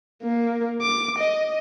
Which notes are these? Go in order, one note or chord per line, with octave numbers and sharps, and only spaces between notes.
A#3
D6
D#5